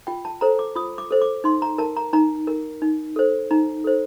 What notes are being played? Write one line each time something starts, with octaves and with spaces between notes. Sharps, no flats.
F4 G5
A5
A4 C5 A#5
D6
F4 D#6
D6
A4 C5
D6
D#4 C6
A#5
A#4 A5
A#5
D#4 A#5
A#4
D#4
A4 C5
D#4 A#5
A4 C5